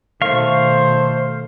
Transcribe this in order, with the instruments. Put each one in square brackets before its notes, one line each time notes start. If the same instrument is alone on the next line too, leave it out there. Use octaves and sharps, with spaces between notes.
[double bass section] B2 D#3 [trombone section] A3 C5 [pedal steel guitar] F5 C#6